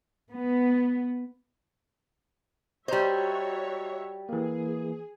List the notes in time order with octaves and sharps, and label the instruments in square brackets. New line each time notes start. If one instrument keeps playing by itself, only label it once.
[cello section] B3
[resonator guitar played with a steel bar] G3 C5 [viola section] F#4 C#5 E5 [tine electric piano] D#5 A#5
[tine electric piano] E3 A#3 [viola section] G#4